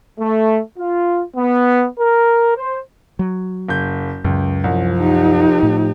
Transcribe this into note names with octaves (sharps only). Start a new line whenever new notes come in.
A3
F4
B3
A#4
C5
F#3
F#1 G6
C#2 F#2
C2 F3 C#4
D#4 G4
A2 F3